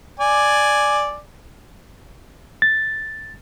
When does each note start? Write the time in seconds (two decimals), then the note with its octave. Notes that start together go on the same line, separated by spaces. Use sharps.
0.20 D5 G#5
2.62 A6